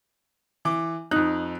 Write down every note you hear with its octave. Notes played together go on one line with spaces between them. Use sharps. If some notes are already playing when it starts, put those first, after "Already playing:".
E3 D6
F2 D#4 F#6